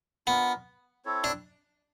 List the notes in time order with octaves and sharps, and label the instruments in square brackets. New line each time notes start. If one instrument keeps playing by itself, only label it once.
[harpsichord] B3 [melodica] D4 F4 A#4
[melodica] C4 E4 A4 C#5
[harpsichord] D4